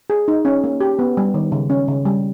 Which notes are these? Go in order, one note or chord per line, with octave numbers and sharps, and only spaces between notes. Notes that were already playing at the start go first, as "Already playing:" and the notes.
G#4
D#4
C#4
A#3
G4
B3
G3
D#3
C#3
C#4
C#3
G3